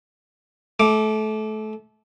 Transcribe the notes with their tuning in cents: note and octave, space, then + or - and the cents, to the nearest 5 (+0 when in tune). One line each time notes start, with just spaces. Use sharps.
A3 -25 D6 +0